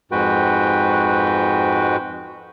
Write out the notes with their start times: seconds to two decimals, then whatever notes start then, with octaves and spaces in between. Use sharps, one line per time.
0.12 F2 G#2 G#3 F#4 B4 G5